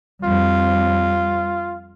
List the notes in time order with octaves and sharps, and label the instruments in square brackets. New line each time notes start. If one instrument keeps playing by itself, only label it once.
[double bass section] F2 G3 C4 [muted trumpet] F4